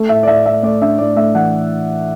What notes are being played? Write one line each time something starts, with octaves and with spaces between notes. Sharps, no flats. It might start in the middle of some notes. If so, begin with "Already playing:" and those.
Already playing: A3
A2 E5
D5
A2 E5
A2 E5
A3 D5
D4 E5
A2 D5
A3 E5
E3 F#5